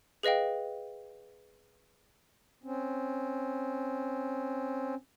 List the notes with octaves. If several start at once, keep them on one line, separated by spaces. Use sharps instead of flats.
G#4 B4 D#5 F5 G5
C4 C#4